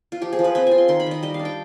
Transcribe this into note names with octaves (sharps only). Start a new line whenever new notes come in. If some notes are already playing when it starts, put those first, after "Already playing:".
F4
F3 G4
G#4
F3
B4
C4 B4
F4 G#5
C6
D#3 C6
B5
D#3 D#5
G3 D#5
F5
D4
G5